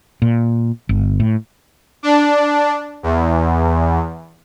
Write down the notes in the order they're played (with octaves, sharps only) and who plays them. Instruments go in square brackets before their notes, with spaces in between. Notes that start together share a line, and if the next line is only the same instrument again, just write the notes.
[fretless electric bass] A#2
G1
A2
[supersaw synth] D4
E2